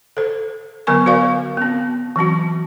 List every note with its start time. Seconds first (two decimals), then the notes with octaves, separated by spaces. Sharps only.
0.17 A4 C5
0.87 D3 F#3 B3 A#4 G#5 C#6
1.06 F#4 A#4 C5 D5 F5 C#6
1.57 B3 C4
2.16 E3 F#3 C4 F#4